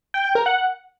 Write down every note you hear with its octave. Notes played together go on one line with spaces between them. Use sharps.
G5
G5
A#4
F#5